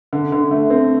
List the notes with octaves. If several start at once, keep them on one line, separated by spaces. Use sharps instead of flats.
D3
D3
A3
C4